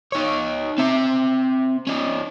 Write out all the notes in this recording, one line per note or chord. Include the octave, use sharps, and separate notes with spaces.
D#4 C#5
C4 E5
C#4 D#4